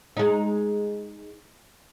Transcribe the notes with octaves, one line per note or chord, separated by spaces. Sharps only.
G#3 D#4